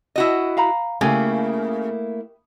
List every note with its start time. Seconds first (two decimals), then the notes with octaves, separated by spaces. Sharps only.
0.16 E4 F#4 D#5
0.57 F5 A#5 B5
1.01 C#3 A3 A#3 E4 G4 G#5